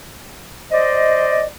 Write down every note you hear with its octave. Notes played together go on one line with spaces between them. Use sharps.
C5 D5 D#5